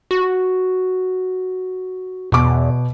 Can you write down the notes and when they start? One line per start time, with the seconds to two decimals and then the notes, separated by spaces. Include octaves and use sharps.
0.11 F#4
2.32 E2 B2 D6